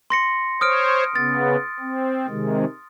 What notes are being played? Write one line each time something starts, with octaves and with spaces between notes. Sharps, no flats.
C6 A#6 C#7
C5 C#5 D#6 F6 D7
C#3 B3 A6
C4
C3 D#3 G#3